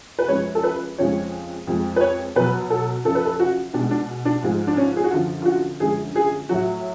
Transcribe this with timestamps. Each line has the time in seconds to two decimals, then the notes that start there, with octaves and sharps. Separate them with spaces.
0.19 B4
0.28 F#2 F3 G#3 C#5
0.55 A4
0.63 B4
0.98 F2 C#3 F3 G#3 C#5
1.67 F2 F3 G#3
1.96 B4
2.01 C#5
2.36 B2 F#3 B4
2.70 A4
3.05 F#2 C#3 F3 A4
3.15 B4
3.25 A4
3.40 F#4
3.74 B2 G#3 D4
3.91 D4
4.25 D4
4.42 G#2 F3 G#3
4.67 D4
4.77 C#4
4.97 G#4
5.04 F#4
5.11 F#2 D3 F3 F4
5.42 F4
5.45 F#4
5.80 F#2 D3 F3 G#3 G#4
6.16 G#4
6.49 A2 F#3 F#4